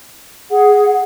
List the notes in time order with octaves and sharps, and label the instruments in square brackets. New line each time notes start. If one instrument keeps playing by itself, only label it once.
[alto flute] G#4 [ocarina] F#5